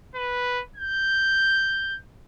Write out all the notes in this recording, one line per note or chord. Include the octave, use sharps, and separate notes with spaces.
B4
G6